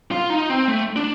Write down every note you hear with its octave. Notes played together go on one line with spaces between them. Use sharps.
F4
D#4
C4
A3
D4